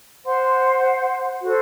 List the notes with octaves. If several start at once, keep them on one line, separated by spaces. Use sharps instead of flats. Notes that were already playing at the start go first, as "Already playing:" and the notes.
C5 F#5 C6
F#4 A4 C5